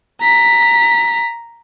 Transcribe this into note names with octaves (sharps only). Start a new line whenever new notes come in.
A#5 B6